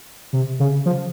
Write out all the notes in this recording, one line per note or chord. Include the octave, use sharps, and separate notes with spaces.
C3
C#3
F3